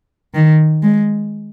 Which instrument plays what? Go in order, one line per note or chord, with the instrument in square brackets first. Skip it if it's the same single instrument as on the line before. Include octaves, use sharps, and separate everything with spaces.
[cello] D#3
G#3